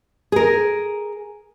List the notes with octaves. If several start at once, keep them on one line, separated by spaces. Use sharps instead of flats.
G#4 A#4